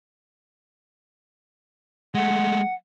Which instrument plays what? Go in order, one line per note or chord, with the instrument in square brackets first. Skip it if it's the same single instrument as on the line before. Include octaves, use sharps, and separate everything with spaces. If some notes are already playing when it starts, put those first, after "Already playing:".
[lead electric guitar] G#3 A3 [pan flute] F#5